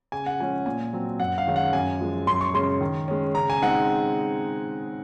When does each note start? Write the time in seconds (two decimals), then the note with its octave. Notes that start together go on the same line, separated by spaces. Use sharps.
0.12 C#3 G#5
0.26 F#5
0.39 F3 G#3 C#4 G#5
0.66 A#2 G#5
0.93 F#3 C4
1.20 F#2 F#5
1.38 F5
1.47 D#3 G#3 C#4
1.56 F#5
1.73 F#2 G#5
2.00 F3 G#3
2.27 F#2 C6
2.41 C#6
2.54 C#3 G#3 C#4 C6
2.81 D#3
3.08 G#3 C#4
3.34 C#3 A#5
3.50 G#5
3.62 G#3 C4 D#4 F#5